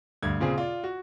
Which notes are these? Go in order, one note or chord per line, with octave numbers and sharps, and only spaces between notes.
D2 G2 G#6
A#2 C#3 C4 G#4
F4 D5
F#4